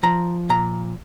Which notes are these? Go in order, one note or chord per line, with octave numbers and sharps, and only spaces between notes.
F3 A#5
A#2 A#5